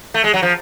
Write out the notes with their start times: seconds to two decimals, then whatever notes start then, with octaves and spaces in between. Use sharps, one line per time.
0.14 A3
0.24 G#3
0.34 F#3
0.42 F3